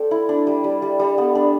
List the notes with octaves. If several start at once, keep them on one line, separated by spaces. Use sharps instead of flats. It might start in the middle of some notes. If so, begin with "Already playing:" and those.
Already playing: C4 A4 D5
E4
D4
G3
G3
G3
G3
B3
D4